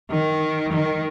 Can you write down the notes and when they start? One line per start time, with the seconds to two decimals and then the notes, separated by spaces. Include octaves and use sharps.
0.11 D#3
0.73 D#3